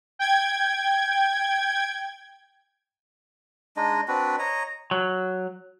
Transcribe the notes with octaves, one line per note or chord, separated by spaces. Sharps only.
G5 G#6
G#3 D4 D#4 D#5
C4 D4 F#4 B4
C#5 D#5 A#5
F#3